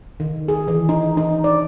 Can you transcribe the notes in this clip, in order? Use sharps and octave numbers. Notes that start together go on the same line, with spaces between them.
D#3
G#4
E3
D#4
D#4
D5